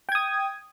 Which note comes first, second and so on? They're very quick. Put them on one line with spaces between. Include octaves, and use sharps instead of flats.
G5 G#6 D#6